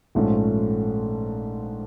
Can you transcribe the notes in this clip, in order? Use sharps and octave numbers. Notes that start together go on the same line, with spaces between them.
A#1 G#2 F3 A3 C#4